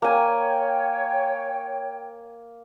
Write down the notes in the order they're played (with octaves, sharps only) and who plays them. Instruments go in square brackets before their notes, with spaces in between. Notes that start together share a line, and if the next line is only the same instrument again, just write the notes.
[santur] A#3 G#5 [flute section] C#5 G5